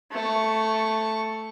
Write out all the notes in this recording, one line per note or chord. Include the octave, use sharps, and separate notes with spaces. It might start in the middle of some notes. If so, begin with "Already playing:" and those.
A3 C#6